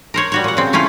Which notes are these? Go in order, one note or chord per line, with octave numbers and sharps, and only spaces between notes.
A#4 C5 C#5
G3 F#4 C#5
A#2 F#5
C#3 C4
A3 C#4 E4 F4